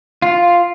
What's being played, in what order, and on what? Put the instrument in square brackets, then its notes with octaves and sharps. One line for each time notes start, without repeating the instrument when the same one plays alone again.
[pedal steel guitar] F4